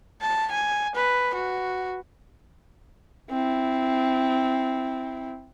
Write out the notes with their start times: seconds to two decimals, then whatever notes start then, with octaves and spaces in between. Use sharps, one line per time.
0.21 A5
0.51 G#5
0.95 B4
1.34 F#4
3.31 C4 E4